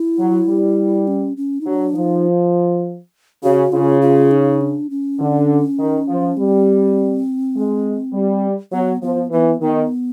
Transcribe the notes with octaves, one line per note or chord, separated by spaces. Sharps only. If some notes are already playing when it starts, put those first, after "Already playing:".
Already playing: E4
F#3
G3
C#4
C#4
D#4
F#3 D4
F3 D#4
C#3 F#4
C#3 F4
F4
D#4
D4
C#4
D3
D#3
F3
G3 C4
G#3
G3
F#3 B3
F3 B3
E3 B3
D#3 B3